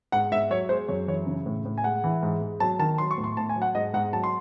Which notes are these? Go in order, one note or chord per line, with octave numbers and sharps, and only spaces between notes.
G#2 F#5
G#2 E5
F#3 C#5
G#3 C5
F#2 C#5
E3 C#5
C#3
A2
A2
G#5
G#3 F#5
E3
G#2
G#2
F#3 A5
D#3 A5
F#3 C6
C#6
A2
C6
A2 A5
G#5
F#3
F#5
G#2 D#5
G#2 F#5
F#3 A5
C6